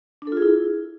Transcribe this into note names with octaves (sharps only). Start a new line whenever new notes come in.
D4
A4
F4
G#4
E4